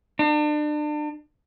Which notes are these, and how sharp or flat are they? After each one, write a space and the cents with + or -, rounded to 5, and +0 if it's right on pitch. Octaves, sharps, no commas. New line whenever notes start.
D4 +35